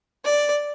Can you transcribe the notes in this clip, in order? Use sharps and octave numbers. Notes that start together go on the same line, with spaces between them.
D5